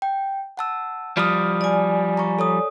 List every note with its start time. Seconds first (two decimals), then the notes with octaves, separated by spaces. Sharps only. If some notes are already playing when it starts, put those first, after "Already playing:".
0.02 G5
0.57 F#5 A5 E6
1.17 F3 G3 D#6 F6 D7
1.61 D5 G#5
2.17 A#5 C#6
2.39 A4 C#5 D#6